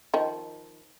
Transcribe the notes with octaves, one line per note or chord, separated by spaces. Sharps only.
D#3 F3